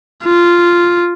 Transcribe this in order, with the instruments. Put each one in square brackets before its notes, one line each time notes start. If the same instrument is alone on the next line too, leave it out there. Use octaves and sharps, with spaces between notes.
[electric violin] F4